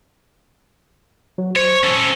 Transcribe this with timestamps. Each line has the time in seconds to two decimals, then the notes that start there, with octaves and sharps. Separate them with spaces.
1.38 F#3
1.56 C5 C#5
1.83 C#4 A4